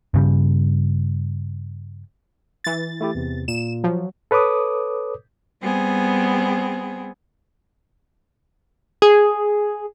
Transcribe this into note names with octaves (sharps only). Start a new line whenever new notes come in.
G2 C#3 G3
E3 A6
A3 E4 G4
E2 C3
A#2 E7
F3 F#3
A4 B4 C#5 D6 D#6
G3 B3 C4 G#4
G#4